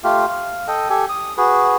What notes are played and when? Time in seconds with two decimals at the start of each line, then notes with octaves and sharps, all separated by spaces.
0.04 A3 F4 G4 F5
0.29 F5
0.68 A4 D#5 G5
0.90 G4 A4 G#5
1.09 D#6
1.37 F#4 G#4 B4